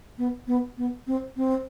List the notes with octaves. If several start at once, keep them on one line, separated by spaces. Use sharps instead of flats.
B3
B3
B3
C4
C4